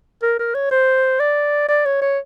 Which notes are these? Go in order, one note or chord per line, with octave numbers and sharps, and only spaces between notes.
A#4
A#4
C#5
C5
D5
D5
C#5
C#5